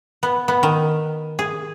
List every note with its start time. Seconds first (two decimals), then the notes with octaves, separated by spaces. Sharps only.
0.23 B3
0.48 B3
0.63 D#3
1.39 G#4